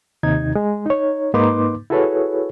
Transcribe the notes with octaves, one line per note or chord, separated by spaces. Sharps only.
D#2 C3 D#4 G#6
G#3
D#4 C#5
G#2 A#3 D#4 B4 C6 D6
E4 F#4 G#4 A4 B4 C#5